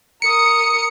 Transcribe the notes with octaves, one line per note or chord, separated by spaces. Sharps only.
A#4 D#6 C#7